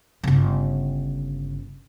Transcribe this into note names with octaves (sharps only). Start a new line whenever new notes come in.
G1 C#3